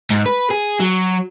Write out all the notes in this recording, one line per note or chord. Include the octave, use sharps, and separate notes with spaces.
G#2
B4
G#4
F#3